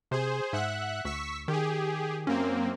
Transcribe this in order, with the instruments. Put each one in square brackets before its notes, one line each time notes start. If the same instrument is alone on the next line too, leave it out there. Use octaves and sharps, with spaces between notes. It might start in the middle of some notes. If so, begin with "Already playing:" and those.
[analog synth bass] C3 [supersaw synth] G#4 C5
[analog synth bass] G#2 [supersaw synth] E5 F#5 F#6
[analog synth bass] D2 [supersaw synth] C#6 E6 B6
[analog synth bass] D#3 [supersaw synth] G4 G#4
[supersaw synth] F#2 A#3 C4 [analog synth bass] C#4